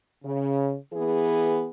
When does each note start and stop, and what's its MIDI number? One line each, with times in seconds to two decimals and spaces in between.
0.23 0.75 49
0.93 1.68 52
0.93 1.68 59
0.93 1.68 68